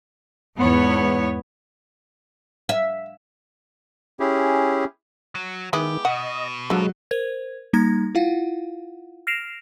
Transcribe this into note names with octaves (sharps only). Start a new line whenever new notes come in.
E2 G#2 B3 C#5
E5
C#4 E4 G4 G#4
F#3
D#3 G#3 B3 E4 G4
B2 D#5 F#5
D3 F3 F#3 G#3
A#4 C5 G#6
G3 A#3 D#4 A#5 G#6 A#6
E4 F4 F5 F#5
F6 A#6 C7 D7 E7 F7